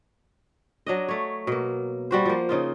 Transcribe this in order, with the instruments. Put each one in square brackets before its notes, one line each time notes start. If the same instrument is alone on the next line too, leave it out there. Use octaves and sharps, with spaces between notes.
[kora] F#3 D4 D#5
A3 C#5
B2 A#3
G3 F#4 C5
F3 A#3
C#3 D#4 F4